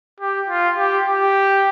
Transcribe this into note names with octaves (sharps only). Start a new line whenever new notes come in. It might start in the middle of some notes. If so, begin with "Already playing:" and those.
G4
F4
G4
G4